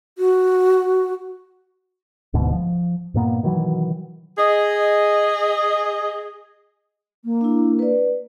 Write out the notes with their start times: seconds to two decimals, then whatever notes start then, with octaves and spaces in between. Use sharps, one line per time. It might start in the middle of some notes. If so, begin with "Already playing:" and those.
0.18 F#4
2.34 D1 D2 G#2 B2
2.53 F3
3.14 G2 A#2 A#3 B3
3.43 B2 D#3 E3 F#3
4.38 G#4 D#5
7.25 A#3
7.41 D4 E4
7.79 B4 D5